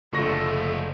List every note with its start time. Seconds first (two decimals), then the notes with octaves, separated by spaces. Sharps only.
0.13 F#1 D3 F3 A3 A4 C#6 A#6